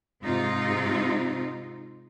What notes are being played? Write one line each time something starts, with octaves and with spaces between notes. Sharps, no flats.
G#2 C3 C4 D#4 F4